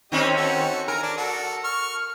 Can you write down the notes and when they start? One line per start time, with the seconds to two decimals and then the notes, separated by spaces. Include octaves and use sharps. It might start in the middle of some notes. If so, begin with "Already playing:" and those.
0.12 D#3 C4 C#4 G4 D#5
0.37 F#4 A4
0.88 A#4 G#5 A#5
1.02 D4
1.17 F#4 A4
1.64 C#6 F6